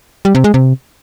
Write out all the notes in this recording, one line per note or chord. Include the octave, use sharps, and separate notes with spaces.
G3
C3
G#3
C3